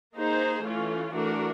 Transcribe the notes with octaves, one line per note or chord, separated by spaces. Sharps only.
A#3 D#4 G#4 C5
E3 A3 C#4 F4
E3 A3 D4 F#4 A#4